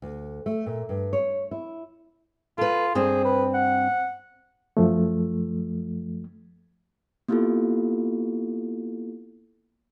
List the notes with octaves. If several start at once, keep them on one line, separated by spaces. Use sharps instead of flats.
D2
A3
A#2
G2
C#5
E4
F4 A4 B4
G2 C4 G#4
B4
F#5
F#2 F3 A3
A#3 B3 E4 F4 G4 A4